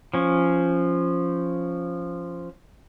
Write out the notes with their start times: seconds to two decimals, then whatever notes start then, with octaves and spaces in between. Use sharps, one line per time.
0.14 F3 C#4